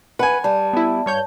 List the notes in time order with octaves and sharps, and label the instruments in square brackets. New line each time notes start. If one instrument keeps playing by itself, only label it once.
[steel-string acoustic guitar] B4 [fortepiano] F#5 G#5
[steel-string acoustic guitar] G3 [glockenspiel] A5
[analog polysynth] B3 E4
G2 C#5 G6